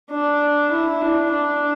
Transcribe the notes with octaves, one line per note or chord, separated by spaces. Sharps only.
D4
E4
D4
D4